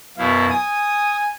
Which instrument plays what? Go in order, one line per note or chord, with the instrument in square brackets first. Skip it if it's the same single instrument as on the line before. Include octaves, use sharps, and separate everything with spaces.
[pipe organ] F#2 B2 E4 [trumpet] F5
[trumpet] G#5 [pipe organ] D#6